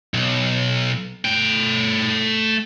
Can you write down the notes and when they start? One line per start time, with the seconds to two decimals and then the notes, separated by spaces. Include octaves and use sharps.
0.14 B1
1.25 A3 G5